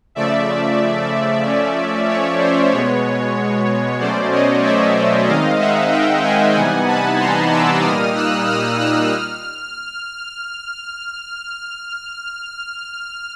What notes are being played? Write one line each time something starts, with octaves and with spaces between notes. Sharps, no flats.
C#3 F3 A3 D5 E5
F3 A3 C#4
C#5
C5
B2 G#3 B3 C#5
B2 F#3 A3 C#4 C5 D5
C#5 D#5
D5 E5
D#3 G#3 C4 D#4 D#5 F5
E5 F#5
F5 G5
F#5 G#5
C3 E3 G3 B3 D#4 F#5 G#5
A5 B5
A#5 C6
D6 E6
A#2 G3 A#3 D#4 D#6 F6
E6 F#6
D#6 F6
E6 F#6
F6